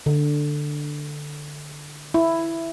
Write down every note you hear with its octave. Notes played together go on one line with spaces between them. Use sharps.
D3
E4